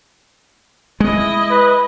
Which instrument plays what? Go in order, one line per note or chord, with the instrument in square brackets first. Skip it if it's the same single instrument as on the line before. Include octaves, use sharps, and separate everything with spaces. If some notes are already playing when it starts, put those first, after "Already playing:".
[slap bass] G#3 [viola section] E4 D#5
[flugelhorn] B4